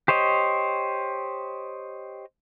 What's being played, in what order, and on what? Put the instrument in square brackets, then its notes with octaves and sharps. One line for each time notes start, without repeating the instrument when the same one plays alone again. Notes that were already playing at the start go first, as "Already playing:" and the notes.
[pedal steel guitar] G4 C5 C#5 D#5